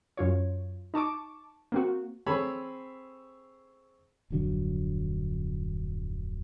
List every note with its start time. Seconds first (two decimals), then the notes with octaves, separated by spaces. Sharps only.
0.17 F#2 F4 C#5
0.94 D#4 A5 C#6 D6
1.72 A#3 C4 F#4
2.26 C4 G#4 A4 C#5 B5
4.30 D1 F2 D3 F#3